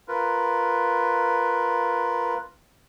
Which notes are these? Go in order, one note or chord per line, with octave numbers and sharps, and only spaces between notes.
F4 A#4 B4